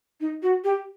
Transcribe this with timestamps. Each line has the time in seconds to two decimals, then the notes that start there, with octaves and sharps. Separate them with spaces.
0.20 D#4
0.42 F#4
0.64 G4